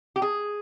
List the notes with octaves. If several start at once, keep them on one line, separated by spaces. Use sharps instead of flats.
G4
G#4